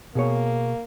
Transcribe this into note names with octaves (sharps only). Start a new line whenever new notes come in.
B2 A#3 G#4 C#5